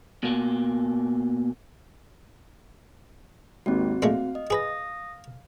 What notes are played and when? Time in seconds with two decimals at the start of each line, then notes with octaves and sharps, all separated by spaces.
0.23 B2 A#3
3.66 G#1 D#2 D#3 C4 F#4
4.02 A#2 G#3 A3 F5
4.35 D#5
4.50 G#4 B4 D#6 A#6